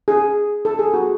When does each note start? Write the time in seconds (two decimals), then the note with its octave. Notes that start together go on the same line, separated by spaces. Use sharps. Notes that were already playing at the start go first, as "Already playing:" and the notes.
0.08 G#4
0.65 A4
0.79 G#4
0.94 F#4